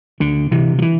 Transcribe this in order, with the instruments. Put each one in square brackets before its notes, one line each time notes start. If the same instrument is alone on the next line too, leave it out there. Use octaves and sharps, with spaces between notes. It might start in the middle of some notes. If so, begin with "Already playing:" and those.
[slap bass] D2 D3
C3 E3
F3
E3